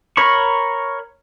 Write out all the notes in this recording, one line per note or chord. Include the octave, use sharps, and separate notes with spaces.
A#4 C#5 B5 C#6